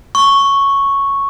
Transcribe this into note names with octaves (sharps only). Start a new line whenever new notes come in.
C#6